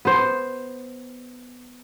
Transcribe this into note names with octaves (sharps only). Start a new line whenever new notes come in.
B3 C5